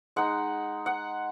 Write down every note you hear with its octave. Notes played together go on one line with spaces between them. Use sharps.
G#3 D#4 F#5
F#5